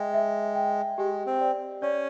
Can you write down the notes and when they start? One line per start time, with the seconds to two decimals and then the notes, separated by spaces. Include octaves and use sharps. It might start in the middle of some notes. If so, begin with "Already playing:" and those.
Already playing: G#3 E5 G5
0.14 E5
0.55 G5
0.98 G#3 G4
1.26 C4
1.40 D5
1.82 C#4 D5